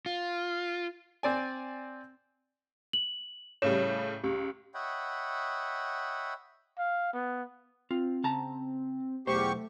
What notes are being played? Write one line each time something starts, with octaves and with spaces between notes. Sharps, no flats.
F4
C4 D5 G#5
F#7
A2 C#3 G3 C#5 E7
C#2 G4
C#5 D#5 E5 F#5 G5 B5
F5
B3
C4 F4
C#3 A5 A#5
B1 E2 A3 G4 C5 C#6